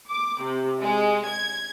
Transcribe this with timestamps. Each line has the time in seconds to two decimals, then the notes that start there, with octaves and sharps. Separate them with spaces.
0.11 D6
0.41 C3
0.82 G#3
1.28 G#6